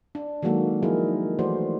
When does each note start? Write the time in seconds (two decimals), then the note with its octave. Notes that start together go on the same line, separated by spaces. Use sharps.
0.15 D4
0.42 D#3 F#3 G#3 A#3 F#4 A4
0.83 F3 D#4 E4 G#4 A#4
1.39 E3 A3 F#4 G#4 C5 D5